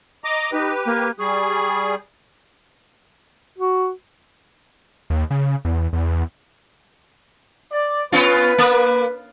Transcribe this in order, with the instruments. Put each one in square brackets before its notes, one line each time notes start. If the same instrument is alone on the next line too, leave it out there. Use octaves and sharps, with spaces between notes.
[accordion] D#5 A#5 D6
[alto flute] D#4 [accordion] G4 B4
[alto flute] A#3
[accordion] G3 G#4 [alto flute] C#6
[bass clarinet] F#4
[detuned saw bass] D#2
C#3
E2
E2
[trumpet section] D5
[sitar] B3 C#4 F4 [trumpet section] B4
[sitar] A#3